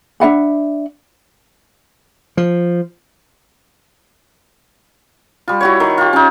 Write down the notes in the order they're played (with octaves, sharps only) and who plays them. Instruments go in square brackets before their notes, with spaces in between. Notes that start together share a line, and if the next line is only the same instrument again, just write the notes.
[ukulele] D4 E5 F#5 B5
[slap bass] F3
[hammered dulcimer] G3 F4
E4 F#4 C#5
D#3
F4 G4
C#4 D#4